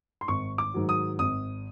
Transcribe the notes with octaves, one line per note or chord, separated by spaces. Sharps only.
C6
G#1 C#6
D6
G#2 D#3 F#3
D#6
G#1 D#6